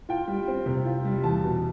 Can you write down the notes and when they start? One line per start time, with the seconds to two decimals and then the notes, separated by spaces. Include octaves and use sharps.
0.09 F4 G5
0.28 G3
0.48 C4
0.66 C3
0.85 F4
1.05 G3
1.24 E2 A5
1.43 B2